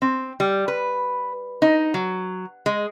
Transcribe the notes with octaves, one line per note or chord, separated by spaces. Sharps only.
C4
G3
B4
D#4
F#3
G#3